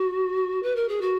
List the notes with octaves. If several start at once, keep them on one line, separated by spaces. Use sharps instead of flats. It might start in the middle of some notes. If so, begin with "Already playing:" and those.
Already playing: F#4
B4
A#4
G#4
F#4